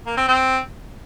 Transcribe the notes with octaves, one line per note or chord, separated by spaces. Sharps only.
A#3
C4
C4